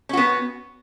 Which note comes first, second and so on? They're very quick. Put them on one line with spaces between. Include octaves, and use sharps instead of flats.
C#4 F#4 B3